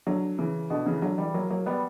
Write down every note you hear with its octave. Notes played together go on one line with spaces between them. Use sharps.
D3 F#3
C#3 E3
B2 D3
C#3 E3
D3 F#3
E3 G3
F#3 A#3
F#3 A#3
G3 B3